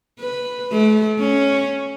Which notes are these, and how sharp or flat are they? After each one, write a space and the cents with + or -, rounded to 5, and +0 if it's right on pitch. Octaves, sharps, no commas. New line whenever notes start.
B4 +0
A3 -35
C#4 +0